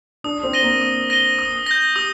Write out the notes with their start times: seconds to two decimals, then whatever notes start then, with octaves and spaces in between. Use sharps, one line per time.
0.24 D4 D#6
0.43 C4
0.53 A#6 D#7 G7
0.62 A#3
0.82 D#6
1.10 A#6 D#7 G7
1.39 D#6
1.66 G6 A#6
1.96 G4 D#6